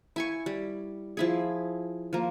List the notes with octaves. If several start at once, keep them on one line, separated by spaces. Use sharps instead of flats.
E4 G#5 C#6
G3
F3 E4 G#4
F3 A#3